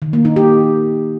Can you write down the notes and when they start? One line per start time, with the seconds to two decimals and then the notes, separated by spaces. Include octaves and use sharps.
0.02 D#3
0.13 A#3
0.25 D#4
0.36 G4